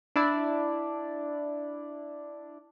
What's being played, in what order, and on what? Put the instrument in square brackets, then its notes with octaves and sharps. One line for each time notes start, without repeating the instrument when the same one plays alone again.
[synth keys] D4 E4 D5